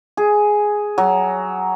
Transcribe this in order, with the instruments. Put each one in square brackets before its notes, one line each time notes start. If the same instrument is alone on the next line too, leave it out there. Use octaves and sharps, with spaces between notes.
[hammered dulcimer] G#4
F#3